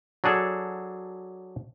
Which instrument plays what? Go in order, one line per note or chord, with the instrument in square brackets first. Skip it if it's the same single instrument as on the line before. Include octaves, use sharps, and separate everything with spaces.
[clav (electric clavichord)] F#3 D4 G#4 A4